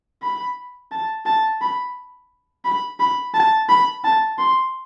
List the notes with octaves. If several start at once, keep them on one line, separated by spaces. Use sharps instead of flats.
B5
A5
A5
B5
B5
B5
A5
B5
A5
C6